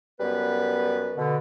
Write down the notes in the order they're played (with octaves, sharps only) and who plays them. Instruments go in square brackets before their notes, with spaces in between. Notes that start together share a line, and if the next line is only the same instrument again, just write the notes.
[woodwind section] F#2 G3 B3 B4
B2 D3